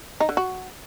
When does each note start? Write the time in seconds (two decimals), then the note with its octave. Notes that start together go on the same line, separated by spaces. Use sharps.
0.20 D#4
0.29 D3
0.37 F#4